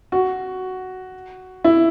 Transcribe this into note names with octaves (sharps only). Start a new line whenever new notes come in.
F#4
E4